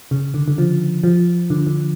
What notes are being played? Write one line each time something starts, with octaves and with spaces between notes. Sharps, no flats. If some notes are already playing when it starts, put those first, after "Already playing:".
C#3
D3
D3
F3
F3
D3
D3